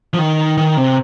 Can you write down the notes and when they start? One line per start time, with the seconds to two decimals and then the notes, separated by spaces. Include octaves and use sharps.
0.14 F3
0.19 D#3
0.57 D#3
0.77 C3